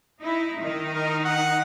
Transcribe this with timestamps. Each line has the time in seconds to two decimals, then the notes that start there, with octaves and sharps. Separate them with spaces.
0.20 D#4 E4
0.60 D#3 D#4
0.95 A#4
1.25 F#5